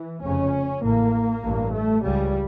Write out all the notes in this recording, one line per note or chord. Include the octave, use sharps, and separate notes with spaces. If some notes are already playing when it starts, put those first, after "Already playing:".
Already playing: E3
F1 F2 C#3 C#4
A1 A2 A#3
A1 G2
A3
C#2 C#3 G3